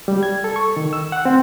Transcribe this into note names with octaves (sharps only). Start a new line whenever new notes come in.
G3
G#6
A4
C#6
D#3
E6
F#5
C4